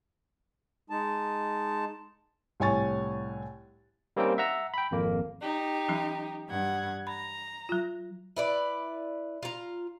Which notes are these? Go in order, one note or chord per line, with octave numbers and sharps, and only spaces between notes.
G#3 D#4 A5
C2 A2 C#5 G#5 C#6 A6
G3 A#3 C4 C#4 D#4 G5
E5 F#5 A#5 E6
G5 B5
G#1 F2 A#3
D#4 G4
E3 F#3 C#4
G2 F#5 G#6
A#5 B5
F#3 F4
E4 B4 D5
F4 A#5